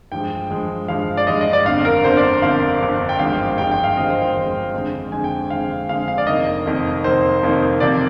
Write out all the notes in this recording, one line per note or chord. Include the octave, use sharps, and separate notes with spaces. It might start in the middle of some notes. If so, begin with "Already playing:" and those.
G2 F3 G#3 G5
G2 F3 G#3
G2 F3 G#3 F5
D5
G2 F3 G#3 D#5
D#5
D5
G1 F2 D3 F5
A#4
G1 F2 D3 C5
D5
G1 F2 D3 F5
G1 F2 D3
G5
G#1 G2 F3 G#3 F5
G#1 G2 F3 G#3 G5
G5
F5
G#1 G2 F3 G#3 D#5
C5
G5
G#1 G2 F3 G#3
F2 D3 G#3
F2 D3 G#3 G#5
G5
F2 D3 G#3 F5
F2 D3 G#3 F5
F5
D5
F1 F2 D#3 A#3 D#5
F1 F2 D#3 A#3
F1 F2 D#3 A#3 C5
F1 F2 D#3 A#3
F2 C3 F3 A#3 D5